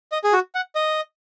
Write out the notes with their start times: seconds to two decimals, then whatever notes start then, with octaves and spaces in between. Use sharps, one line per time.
0.12 D#5
0.24 G#4
0.33 F#4
0.55 F#5
0.75 D#5